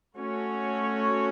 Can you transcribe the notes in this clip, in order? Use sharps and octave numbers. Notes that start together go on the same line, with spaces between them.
A3 C#4 F#4 C#5